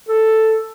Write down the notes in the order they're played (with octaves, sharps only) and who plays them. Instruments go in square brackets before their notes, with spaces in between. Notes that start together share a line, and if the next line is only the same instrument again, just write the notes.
[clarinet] A4